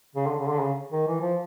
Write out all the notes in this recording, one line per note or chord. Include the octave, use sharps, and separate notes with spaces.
C#3
D3
C#3
D3
C#3
D#3
E3
F3